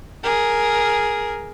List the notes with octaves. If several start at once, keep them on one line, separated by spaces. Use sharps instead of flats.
G#4 A#4